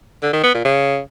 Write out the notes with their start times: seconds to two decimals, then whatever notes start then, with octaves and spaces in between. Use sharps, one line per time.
0.23 D3
0.33 D#3
0.44 B3
0.54 A#2
0.65 C#3